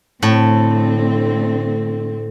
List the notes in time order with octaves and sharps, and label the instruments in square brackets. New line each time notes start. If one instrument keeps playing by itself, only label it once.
[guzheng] A2 [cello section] D3 A3 C4